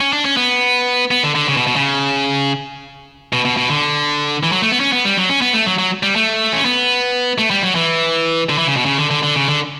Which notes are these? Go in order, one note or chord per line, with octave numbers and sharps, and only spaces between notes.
C#4
D4
C#4
B3
B3
D3
D3
C#3
B2
B2
C#3
B2
B2
B2
D3
E3
F#3
A3
B3
C#4
B3
G3
F#3
C#4
B3
A3
F#3
F#3
G3
A3
C#4
B3
A3
G3
F#3
E3
D3
E3
C#3
B2
C#3
D3
D3
D3
C#3
D3